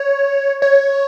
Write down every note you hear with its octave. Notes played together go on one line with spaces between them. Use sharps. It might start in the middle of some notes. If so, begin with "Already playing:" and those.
Already playing: C#5
C#5